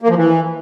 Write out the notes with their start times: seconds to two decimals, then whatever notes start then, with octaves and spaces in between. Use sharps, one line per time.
0.02 A#3
0.09 F3
0.16 E3